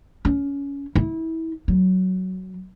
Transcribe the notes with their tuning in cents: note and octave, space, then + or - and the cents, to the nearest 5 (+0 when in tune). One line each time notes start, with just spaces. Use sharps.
C#4 +20
E4 -25
F#3 +10